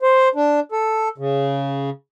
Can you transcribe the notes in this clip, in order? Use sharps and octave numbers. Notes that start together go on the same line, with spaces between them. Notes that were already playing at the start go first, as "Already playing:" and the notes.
C5
D4
A4
C#3